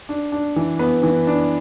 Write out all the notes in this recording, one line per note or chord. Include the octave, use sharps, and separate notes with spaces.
D4
D4
E3
B3 B4
E3
D4